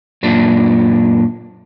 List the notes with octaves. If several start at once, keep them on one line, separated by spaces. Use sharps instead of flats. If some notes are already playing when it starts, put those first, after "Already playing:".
F#2 A#2 D4